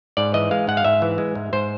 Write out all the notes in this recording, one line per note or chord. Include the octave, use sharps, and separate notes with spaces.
G#2 D5
E3 D#5
G#3 F5
G#2 F#5
F5
G#2 E5
E3
G#3
G#2
G#2 C5